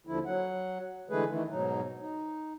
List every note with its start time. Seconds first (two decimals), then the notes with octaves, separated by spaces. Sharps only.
0.07 D#2 D3 F3 E4
0.26 F#3 F#5
1.10 D3 E3 G#3 A3 G#4 B4
1.29 D#3 E3 A3
1.50 G#2 B2 F#3 D#4
2.00 D#4